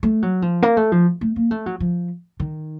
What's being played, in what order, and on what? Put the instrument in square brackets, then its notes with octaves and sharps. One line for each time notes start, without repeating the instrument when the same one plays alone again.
[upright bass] A3
F#3
F3
A#3
A3
F3
A3
A#3
A3
F#3
F3
D#3